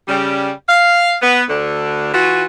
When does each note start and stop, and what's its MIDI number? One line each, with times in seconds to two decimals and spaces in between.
0.08 0.51 49
0.08 0.51 55
0.68 1.15 77
1.22 1.43 59
1.49 2.11 38
1.49 2.11 50
2.13 2.45 52
2.13 2.45 65
2.13 2.45 66